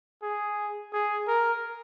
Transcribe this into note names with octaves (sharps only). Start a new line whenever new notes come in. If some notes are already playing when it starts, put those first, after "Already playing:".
G#4
G#4
A#4